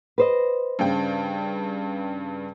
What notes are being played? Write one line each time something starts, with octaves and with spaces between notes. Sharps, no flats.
B4 C5 D#5
G2 C#3 G5